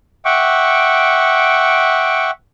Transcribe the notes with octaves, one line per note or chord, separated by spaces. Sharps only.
E5 F#5 G5 C#6 D6